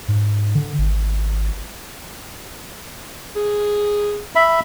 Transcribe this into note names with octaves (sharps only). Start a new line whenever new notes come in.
G#2
D3
G#1
G#4
E5 B5